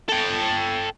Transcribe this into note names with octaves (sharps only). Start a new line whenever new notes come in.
A4 G5